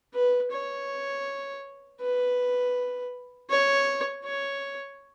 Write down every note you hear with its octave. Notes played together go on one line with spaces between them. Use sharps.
B4
C#5
B4
C#5
C#5